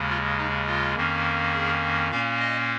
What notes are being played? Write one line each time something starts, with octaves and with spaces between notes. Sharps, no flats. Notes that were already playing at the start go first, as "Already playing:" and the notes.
Already playing: D#2 C#3 G#3
F4
D#4
F4
F2 D#3 A#3 C#4
G#4
A#2 A#3 C#4 F5
D#5